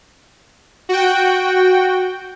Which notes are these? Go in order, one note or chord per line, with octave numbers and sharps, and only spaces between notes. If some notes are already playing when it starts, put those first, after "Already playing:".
F#4 G5